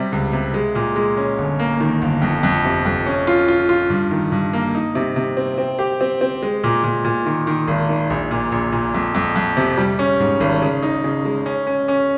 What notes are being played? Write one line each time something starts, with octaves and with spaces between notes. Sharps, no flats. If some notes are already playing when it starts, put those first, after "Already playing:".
Already playing: C3 G3
C#2
C3
G#3
A#2
G#3
C#4
G1
A#3
D#3
G1
F2
F2
C3
F2
C#4
F4
F4
F4
G2
D#3
G2
A#3
D#4
C3
C3
C4
C4
G4
C4
C4
G#3
A#2
A#2
A#2
D#3
D#3
G#1
D#3
A#1
A#2
A#1
A#2
F2
F2
F2
C3
G3
C#4
G#2
G#1
C#3
D#4
C#3
G#3
C#4
C#4
C#4